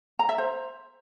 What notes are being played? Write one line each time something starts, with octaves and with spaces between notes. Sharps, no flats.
A#5
E5
C5